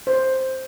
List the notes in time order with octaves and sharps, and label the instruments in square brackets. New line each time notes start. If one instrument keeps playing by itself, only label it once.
[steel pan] C5